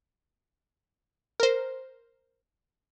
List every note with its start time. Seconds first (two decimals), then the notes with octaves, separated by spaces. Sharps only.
1.40 A#4 C5